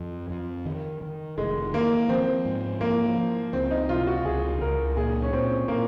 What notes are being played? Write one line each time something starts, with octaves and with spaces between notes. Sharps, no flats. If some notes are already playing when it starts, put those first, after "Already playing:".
Already playing: F2
F2
D#3
D#3
F1 G#3
D#3 A#3
F3 C4
G#2
F3 A#3
F3
C#2 C4
D#4
C3 F4
F#4
C#2 G#4
C#2 A#4
A#2 G#4
C#4
A#2 C4
A#2 A#3